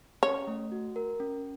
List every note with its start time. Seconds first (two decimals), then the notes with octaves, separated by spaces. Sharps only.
0.23 C#4 C#5
0.47 A3
0.72 F#4
0.96 A#4
1.20 C#4